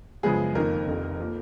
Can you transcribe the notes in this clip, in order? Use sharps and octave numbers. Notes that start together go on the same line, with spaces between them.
F#2 C#3 F3 G#3 B3 G#4
F2 D#3 A#3 A#4
F1 F2 D#3
F3 A#3